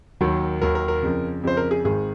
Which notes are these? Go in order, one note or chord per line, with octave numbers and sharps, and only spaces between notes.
D#2 D#3 F#3
D#2 D#3 F#3 A#4
A#4
A#4
F2 C#3 F3
F2 C#3 F3 C5
A#4
G#4
G#1 G#2 D#3 G#4